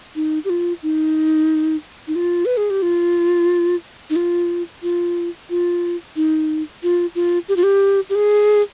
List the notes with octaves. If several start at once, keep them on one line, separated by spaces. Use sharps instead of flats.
D#4
G4
F4
D#4
D#4
F4
B4
G#4
G4
F4
D#4
F4
F4
F4
D#4
F4
F4
G4
F4
G4
G4
G#4